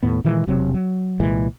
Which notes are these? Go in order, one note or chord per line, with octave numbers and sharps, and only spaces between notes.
D#2 A2 B3
A#2 D#3 E3 G#3
E1 C3 F#3 C4
F#3
C2 A#2 E3 G#3